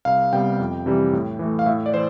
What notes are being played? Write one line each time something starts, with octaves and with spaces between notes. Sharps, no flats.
C2 F5
C3 G3 B3 G5
F2
C3 E3 G3
A2
E3 A3
F5
A2 E5
D5
E3 C5